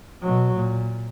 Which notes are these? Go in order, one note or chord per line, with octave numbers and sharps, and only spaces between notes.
B2 F#3
A#2